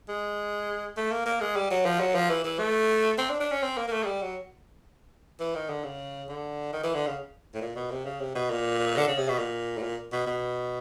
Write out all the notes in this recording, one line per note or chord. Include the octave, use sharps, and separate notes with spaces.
G#3
A3
A#3
A#3
G#3
G3
F#3
F3
F#3
F3
E3
E3
A3
C4
D4
D4
C#4
C4
A#3
A#3
A3
G#3
G3
F#3
E3
D#3
D3
C#3
D3
D#3
E3
D3
C#3
A2
A#2
B2
C3
C#3
C3
B2
A#2
D3
C#3
C3
B2
A#2
A2
A#2
B2
B2